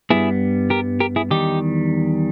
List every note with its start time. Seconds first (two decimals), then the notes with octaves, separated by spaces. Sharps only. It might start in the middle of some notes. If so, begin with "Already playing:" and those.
0.10 G2 G3 B3 E4 G#4
0.70 G4 A#4
1.00 G4 A#4
1.16 E4 G#4
1.31 E2 D#3 G3 D#4 G4